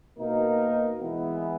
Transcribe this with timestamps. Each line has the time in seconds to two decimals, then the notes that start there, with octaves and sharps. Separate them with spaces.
0.17 B2 A#3 D#4 A#4
1.00 E3 G#3 B3 E4